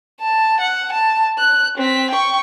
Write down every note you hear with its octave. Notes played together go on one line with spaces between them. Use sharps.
A5
F#5
A5
F#6
C4 B6
G5 C#6